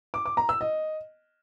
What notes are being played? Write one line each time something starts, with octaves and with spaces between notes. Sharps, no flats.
D6
D6
A#5
E6
D#5